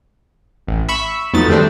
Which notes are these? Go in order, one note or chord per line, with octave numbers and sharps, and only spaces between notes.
A1
E5 B5 C#6 E6
F2 F#3 A3 B3 D#4 A6
D#3 G3 A3 C4 D4